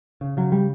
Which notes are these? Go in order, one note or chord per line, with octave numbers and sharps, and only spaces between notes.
C#3
C#3 F#3
G3